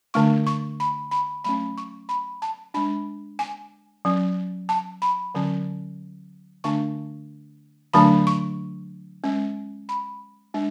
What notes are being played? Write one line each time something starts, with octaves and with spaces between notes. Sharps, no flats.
D3 A3 D4 C#6
C#6
B5
B5
F#3 A3 C#4 B5
C#6
B5
A5
G#3 D4 B5
G#5
F#3 C#4
A5
B5
D3 F#3 C#4
D3 A3 D4 C#6
D3 F#3 A3 D4 B5
C#6
G#3 C#4
B5
G#3 D4